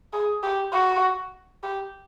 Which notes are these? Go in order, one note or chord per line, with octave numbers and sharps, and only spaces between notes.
G#4
G4
F#4
G4